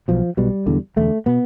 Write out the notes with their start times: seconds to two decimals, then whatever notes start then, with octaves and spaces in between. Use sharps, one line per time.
0.08 B1 B2 F3
0.37 B1 B2 G3
0.66 E1 E2 D3
0.96 E1 E2 D3 A3
1.26 B2 B3